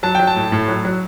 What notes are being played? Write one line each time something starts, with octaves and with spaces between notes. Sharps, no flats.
F#3 A5
F#3 G5
A5
A2
A2
F#3
F#3